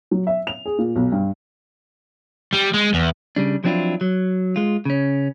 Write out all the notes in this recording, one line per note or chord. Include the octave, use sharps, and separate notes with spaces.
F#3
E5
F7
G#4
A#2
B1
G2
G3
G#3
E2
C#3 G3 D4
F3 F#3 C4 D4 E4 F4
F#3
G#3 F4
C#3 C#4